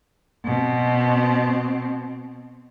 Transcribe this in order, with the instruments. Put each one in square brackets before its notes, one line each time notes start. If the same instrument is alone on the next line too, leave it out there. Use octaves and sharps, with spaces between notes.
[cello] B2 C4